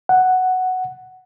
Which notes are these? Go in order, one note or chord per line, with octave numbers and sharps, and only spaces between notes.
F#5